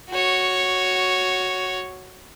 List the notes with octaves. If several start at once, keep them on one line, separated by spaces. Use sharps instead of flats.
F#4 C#5